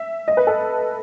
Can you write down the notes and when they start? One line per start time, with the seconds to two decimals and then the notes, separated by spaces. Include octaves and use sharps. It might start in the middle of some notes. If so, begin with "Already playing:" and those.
Already playing: E5
0.28 D#5
0.37 B4
0.47 A4